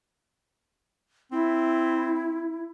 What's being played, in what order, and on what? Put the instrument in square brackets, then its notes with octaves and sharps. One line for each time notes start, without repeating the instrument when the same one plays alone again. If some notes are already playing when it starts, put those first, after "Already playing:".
[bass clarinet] C4 [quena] E4